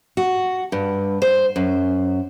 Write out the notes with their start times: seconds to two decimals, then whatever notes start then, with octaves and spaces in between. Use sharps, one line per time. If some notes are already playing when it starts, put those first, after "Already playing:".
0.17 F#4
0.72 G2
1.22 C5
1.56 F#2